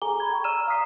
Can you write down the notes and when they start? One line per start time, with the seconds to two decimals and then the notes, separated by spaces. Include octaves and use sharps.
0.02 G#4 A4 G#5 A#5 D6 G7
0.20 A#5 B5 G#6
0.33 G5 C#6
0.44 D5 A#5 E6 F6 D#7 E7
0.67 F5 A#5 D#6 F6 B6 C7